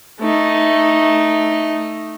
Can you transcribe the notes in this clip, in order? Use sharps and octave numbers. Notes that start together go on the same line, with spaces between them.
A3 D#4